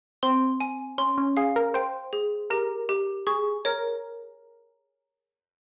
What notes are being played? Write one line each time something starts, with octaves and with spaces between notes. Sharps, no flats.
C4 C6
G#5
C#4 C6
C#4
G#4 F5
A#4
C5 G5
G#4
G4 A#4
G4
G#4 C#6
A#4 C#5